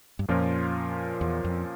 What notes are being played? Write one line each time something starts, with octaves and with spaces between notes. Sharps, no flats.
G2
F2 A#2 F3 C#4 F4 A#4
E2
F2